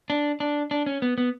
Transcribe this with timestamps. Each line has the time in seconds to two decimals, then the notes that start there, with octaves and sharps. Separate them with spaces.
0.10 D4
0.40 D4
0.71 D4
0.86 C#4
1.02 B3
1.18 B3